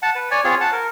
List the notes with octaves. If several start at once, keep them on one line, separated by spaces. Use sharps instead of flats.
F#5 A5
B4
C#5 D5 G#5
C4 F4 G#4 C#5
F#5 A5
A#4